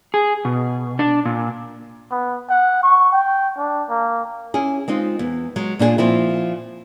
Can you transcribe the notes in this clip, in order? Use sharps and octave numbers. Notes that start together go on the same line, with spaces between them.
G#4
B2
D4
A#2
B3
F#5
C#6
G5
D4
A#3
C#4 E4 G#4
G#3 C4 D#4 F4
E2
F#3 G#3
A#2 D4 E4 G#4
A#2 F3 C4 E4